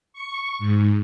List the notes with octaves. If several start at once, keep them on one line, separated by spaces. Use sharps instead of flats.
C#6
G#2